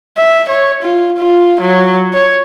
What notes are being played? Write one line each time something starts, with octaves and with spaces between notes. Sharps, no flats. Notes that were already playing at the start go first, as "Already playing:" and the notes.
E5
C#5
F4
F4
F#3
C#5